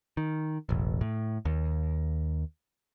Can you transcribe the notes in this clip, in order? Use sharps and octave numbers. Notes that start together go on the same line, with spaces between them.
D#3
E1 A1
A2
D#2